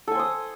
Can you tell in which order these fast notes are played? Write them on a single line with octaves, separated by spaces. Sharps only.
A4 G#5 C5 D#6